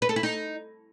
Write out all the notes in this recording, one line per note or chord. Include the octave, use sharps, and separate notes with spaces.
B4
A4
E4
D#4